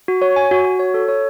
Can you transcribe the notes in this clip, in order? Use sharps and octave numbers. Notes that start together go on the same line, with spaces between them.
F#4
C#5
G#5
F#4
F#4
C#5
A4
C#5